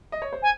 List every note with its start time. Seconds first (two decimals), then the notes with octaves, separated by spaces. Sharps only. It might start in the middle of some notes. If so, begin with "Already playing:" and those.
0.12 D#5
0.22 C#5
0.33 C5
0.42 G#5